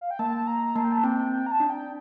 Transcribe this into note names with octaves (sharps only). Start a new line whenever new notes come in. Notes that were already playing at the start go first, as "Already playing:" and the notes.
F5
G5
A#3 A5
A#5
A#3 A5
G5
A5
C4 G5
G5
A#5
A5
D4
G5